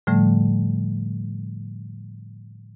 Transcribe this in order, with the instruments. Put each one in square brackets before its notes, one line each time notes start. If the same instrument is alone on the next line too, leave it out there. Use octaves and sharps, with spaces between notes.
[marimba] A2 D3 F3 G3 A3